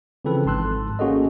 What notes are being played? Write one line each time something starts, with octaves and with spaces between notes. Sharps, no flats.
C#3 E3 F3 C4 A4 B4
G#1 G#2 A5 C6 E6 F#6
A#3 C#4 F#4 G#4 A4 D#5